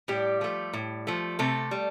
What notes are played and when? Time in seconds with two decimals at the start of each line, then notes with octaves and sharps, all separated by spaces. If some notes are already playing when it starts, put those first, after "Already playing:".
0.08 A2 G3 G4
0.41 F3 A3
0.73 A2
1.07 F3 A3
1.39 C3 A3 A4
1.71 G3